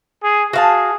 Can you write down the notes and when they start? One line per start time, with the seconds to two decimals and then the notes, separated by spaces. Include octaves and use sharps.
0.24 G#4
0.53 F#4 G#4 F5 A5